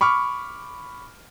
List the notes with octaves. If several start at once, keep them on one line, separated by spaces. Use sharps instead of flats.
B5 C#6 D6 F6